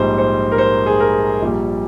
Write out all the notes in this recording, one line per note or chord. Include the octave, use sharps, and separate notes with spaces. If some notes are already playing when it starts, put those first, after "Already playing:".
Already playing: A#1 G#2 G3 C5
C5
A#4
C5
G#4
A#4
A#1 A#2 G3